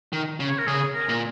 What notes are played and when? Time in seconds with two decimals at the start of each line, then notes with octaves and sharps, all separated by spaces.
0.13 D#3
0.40 C#3
0.48 C#5
0.58 A#4
0.67 C#3 G#4
0.95 A#4
1.09 A#2